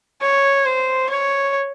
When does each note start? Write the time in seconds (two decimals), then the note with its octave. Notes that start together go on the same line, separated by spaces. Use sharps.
0.22 C#5
0.66 C5
1.10 C#5